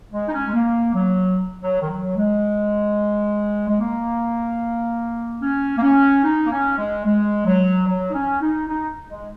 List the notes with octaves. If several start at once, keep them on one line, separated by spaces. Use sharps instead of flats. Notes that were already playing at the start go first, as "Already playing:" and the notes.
G#3
D#4
C#4
G#3
A#3
F#3
F#3
D#3
F#3
G#3
G#3
A#3
C#4
A#3
C#4
D#4
A#3
C#4
G#3
G#3
F#3
F#3
D#4
C#4
D#4
D#4
G#3